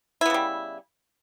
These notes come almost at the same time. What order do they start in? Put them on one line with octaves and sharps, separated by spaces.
E4 B3 C#3 G3